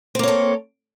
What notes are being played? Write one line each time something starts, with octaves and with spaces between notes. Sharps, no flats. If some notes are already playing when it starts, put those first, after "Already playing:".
A#3 C4 A4 C#5